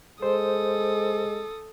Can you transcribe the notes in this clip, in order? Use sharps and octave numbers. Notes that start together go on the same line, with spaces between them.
G#3 A4 C5 D#6